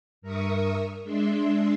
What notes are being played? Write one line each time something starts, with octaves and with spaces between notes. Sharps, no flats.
G2 A#4 E5 C#6 D#6
G#3 D4 E5 C6